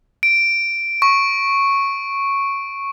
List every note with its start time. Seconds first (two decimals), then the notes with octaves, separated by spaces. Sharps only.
0.23 D7
1.02 C#6